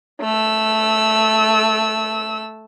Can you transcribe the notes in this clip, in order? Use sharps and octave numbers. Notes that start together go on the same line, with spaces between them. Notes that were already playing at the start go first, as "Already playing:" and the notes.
A3 E6